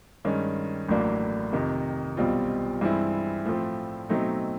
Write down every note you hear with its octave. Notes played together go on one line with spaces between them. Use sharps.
G2 D#3 G#3 C#4
A1 A2 F#3 A#3 D4
F2 C3 D#3
B1 B2 G3 C4 F4
G2 E3 G#3 C4 E4
A2 F3 A3 C4
B2 F#3 A3 C4 D#4